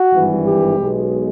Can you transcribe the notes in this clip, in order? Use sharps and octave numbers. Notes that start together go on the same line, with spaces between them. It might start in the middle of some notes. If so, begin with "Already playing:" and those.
Already playing: F#4
G#1 G2 E3 G3
G4
B1 B2 G#3